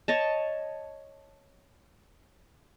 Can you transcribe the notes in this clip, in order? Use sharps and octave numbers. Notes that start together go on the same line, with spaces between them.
C#5 D#5 A5